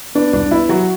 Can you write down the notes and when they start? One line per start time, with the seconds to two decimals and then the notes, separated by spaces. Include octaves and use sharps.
0.15 B3 D4
0.33 C2 D4
0.51 B3 E4
0.69 F#3 F#4